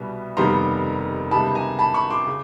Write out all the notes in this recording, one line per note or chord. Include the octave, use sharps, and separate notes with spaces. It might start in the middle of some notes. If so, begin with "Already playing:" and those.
Already playing: C2 B2 G3 B3
F1 D#2 D#3 G3 B3 A#5 C6
C#2 C3 D#3 G3 B3 A5 B5
G#5 A#5
A5 B5
B5 C#6
C6 D6
C#3